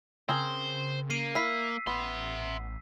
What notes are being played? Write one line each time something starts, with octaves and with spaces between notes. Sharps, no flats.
C#3 C4 G#4 A#4 C5
A#3 C7 D#7
E4 F5 E6 B6 C7
A1 B3 E5 C6